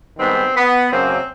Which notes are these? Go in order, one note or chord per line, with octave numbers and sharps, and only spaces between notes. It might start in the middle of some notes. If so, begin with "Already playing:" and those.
G#2 D#3 G3 B3 C4
B3
F#2 C#3 F#3 A#3 C4